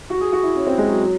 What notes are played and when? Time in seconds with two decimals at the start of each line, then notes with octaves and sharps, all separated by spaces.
0.10 F#4
0.21 G#4
0.33 F#4
0.43 E4
0.55 C#4
0.67 C4
0.78 G#3
0.88 F#3
1.00 F#3